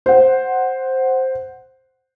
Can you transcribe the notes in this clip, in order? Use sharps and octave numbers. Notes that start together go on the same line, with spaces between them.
C5 F#5